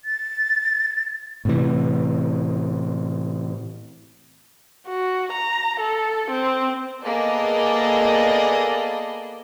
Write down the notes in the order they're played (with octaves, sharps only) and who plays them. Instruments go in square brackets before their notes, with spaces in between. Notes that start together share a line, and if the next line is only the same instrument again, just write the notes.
[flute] A6
[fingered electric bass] A2 C3 E3
[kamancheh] F#4
A#5
A4
C4
[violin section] A#3 B3 G#4 A4 D5 D#5